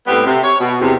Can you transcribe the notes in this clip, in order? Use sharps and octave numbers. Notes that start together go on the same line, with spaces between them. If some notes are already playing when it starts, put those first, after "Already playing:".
A2 G3 B3 C4 G4
C3
C#5
B2
E2 C3